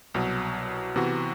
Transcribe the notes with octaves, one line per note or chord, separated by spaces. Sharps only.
C2 B2 F#3
C3 E3 B3 F#4